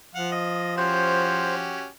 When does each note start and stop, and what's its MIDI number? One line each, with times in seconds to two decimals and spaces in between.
0.15 1.84 53
0.15 0.31 77
0.15 0.31 78
0.32 0.74 75
0.77 1.87 61
0.77 1.87 66
0.77 1.87 67
0.77 1.55 72